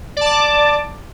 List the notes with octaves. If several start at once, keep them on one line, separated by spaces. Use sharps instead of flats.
D5 A5 D6